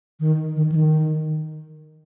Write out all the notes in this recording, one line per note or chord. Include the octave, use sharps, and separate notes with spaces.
D#3
D#3
E3
D#3